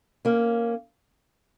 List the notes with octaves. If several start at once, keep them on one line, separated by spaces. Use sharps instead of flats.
A#3 C#4